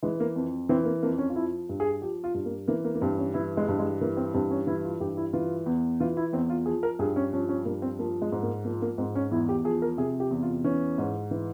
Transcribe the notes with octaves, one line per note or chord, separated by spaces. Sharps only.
E3 G#3
A#3
F2
E3 C4
A#3
F2 A#3
C#4
F4
F3 E4
G2
G#4
F3 G4
F4
G2
A#3
E3 A#3
A#3
A#3
G2 C4
C#4
E3 E4
G#3
G2
G#3
E3 A#3
C4
G2 C4
C#4
E3 E4
F4
G2 G4
E4
E3 F4
E2
E3 F4
E4
E2 C4
F4
F3 G#4
A#4
G2 G#4
C#4
F3 C#4
C#4
G2 A#3
C4
F3 A#3
G#3
G#2
A#3
F3 A#3
A#3
G#2 C4
C#4
E2 E4
G4
F3 G#4
A#4
C3 G#4
G4
E2
F4
E3 C#4
G#2
E3